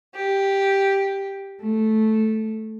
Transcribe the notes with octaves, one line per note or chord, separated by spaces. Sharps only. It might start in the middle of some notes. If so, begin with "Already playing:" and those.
G4
A3